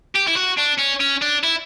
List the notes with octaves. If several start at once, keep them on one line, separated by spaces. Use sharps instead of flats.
G4
E4
F#4
D4
C#4
C#4
D4
E4